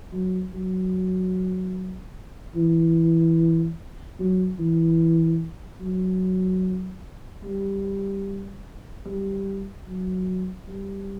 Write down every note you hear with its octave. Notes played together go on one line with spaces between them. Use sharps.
F#3
F#3
E3
F#3
E3
F#3
G3
G3
F#3
G3